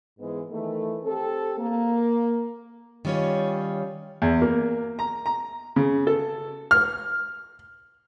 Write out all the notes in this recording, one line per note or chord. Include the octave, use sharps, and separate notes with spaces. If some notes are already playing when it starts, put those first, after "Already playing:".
G#2 E3 G#3 B3
D#3 E3 A3
C4 G4 A4
A#3
D#3 G3 C#4 F4 C#5
E2
A#3
A#5
A#5
C#3
A4
F6